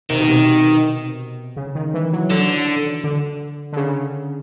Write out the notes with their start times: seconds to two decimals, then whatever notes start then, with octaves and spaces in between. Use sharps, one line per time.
0.10 C3 D#3
0.20 B2
0.29 C3
1.57 C#3
1.75 D#3
1.94 E3
2.13 F#3
2.30 D3 F#3
3.04 D3
3.73 D3
3.77 C#3